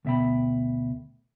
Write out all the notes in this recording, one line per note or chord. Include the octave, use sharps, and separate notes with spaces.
D2 B2 E5 G5 B5